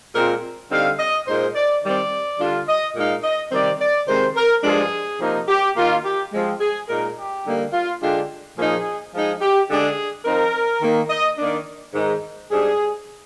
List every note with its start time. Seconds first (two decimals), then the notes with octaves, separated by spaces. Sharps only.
0.14 A#2 G#3 C4 F4 A#4
0.70 D3 G3 C4 D#4 F5
0.99 D#5
1.27 A#2 G#3 D#4 C5
1.55 D5
1.83 D#3 G3 C4 D5
2.39 D3 G3 D4 F4
2.68 D#5
2.95 A#2 G#3 D#4 F5
3.23 D#5
3.51 C3 D#3 G3 C4 D5
3.80 D5
4.07 C3 D#3 G#3 C4 C5
4.36 A#4
4.63 G2 F3 G#3 D4 F4 G#4
5.19 C3 F3 A#3 D#4
5.48 G4
5.76 D#3 A#3 D#4 F4
6.04 G4
6.32 F3 G#3 C4
6.60 G#4
6.88 A#2 G#3 D#4 A#4
7.16 G4
7.45 D3 G3 A#3 D#4
7.73 F4
8.01 D3 G#3 D4 F4 G4
8.57 A#2 F3 A#3 D#4 G#4
9.13 F3 G#3 D#4 G#4
9.41 G4
9.69 D3 G#3 D4 G#4
10.25 F3 C4 D#4 A#4
10.81 D#3 A#3 D#4
11.10 D#5
11.38 D#3 A#3 D4 D5
11.94 G#2 D#3 G#3 D#4
12.51 G#2 G3 D4 G#4